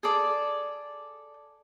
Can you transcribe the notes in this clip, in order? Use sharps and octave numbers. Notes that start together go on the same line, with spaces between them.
G#4 A4 D5